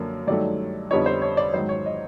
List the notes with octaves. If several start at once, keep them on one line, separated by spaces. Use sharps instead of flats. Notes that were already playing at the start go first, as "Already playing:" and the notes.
Already playing: F#2 D3 F3 A#3
G2 D#3 F#3 A3 D5
F2 D3 G3 B3 D#4 C#5
C5
C#5
D5
G#2 D#3 F#3 C5
C#5
D#5